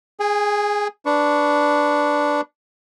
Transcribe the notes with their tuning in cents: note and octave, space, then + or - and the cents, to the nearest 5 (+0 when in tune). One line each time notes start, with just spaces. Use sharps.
G#4 +0 G#5 -40
D4 +0 B4 +0 C#6 +0